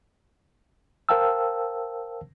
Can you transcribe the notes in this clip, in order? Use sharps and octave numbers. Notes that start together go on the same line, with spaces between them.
A#4 C5 F5 G5 A5 E6